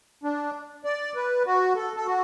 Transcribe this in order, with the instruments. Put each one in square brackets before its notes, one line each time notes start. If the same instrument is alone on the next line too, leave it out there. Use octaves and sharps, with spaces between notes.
[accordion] D4
D5
B4
F#4
A4
A4
F#4